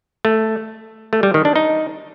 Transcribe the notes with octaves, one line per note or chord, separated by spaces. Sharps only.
A3
A3
G3
D#3
D4
D#4